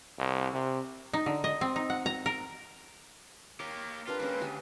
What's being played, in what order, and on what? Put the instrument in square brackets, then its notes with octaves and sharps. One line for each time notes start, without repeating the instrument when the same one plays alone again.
[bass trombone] C2
C3
[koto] D#4
D3
D#5
C4
D#4
F#5
A#5
A#4
[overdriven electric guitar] A#3 G4 [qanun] C#5
[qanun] D4 G4 A#4 [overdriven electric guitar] F4 [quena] B4
[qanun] G#3 C#4 [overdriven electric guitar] A#3 C4
[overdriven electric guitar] D2 [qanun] G4 G#5